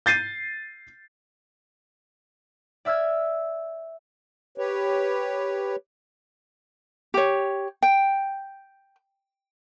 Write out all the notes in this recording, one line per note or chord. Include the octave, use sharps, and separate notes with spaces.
G6 A6 C7 D#7
D5 E5 E6 F6 G#6
G4 B4 C#5
G4 C#5
G5